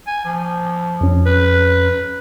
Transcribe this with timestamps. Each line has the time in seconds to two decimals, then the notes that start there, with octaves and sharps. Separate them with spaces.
0.07 G#5
0.25 F3
1.01 F2 C#4
1.26 B4